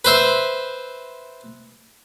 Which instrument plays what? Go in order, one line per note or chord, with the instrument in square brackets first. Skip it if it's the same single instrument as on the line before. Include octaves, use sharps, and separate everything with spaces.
[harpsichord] B4 C5 E5